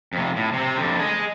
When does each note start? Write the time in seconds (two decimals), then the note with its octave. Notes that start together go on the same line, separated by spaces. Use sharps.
0.13 F2 C3
0.36 A2
0.53 C3 C4
0.76 F2 D3
1.00 G#4 D#5